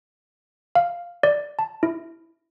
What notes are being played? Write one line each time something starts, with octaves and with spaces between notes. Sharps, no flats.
F5
D5
A5
E4